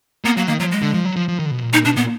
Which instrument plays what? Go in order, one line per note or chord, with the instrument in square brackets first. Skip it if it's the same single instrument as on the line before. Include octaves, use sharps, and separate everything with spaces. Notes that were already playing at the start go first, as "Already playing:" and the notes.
[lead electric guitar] A#3 [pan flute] B3
[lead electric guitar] F#3 [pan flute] A#3
[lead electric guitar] D#3 [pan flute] A#3
[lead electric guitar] F3 [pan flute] F#3
[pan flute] G#3
[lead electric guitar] D3
F3
F#3
F3
F3
D#3
D3
B2
A#2
[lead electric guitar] A#2 [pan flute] D#4
[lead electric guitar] B2 [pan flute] D4
[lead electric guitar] A#2 [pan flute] B3